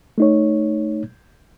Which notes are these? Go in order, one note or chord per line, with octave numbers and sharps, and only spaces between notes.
A3 D#4 C#5